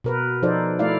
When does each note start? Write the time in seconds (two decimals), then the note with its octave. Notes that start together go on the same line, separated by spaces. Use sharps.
0.04 B2 A#4 B4
0.43 F3 D#4 A4 C5 D5
0.79 A3 E4 D5 F5